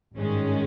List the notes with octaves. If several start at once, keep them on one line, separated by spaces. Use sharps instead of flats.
G#1 G2 D#3 G#3 C#4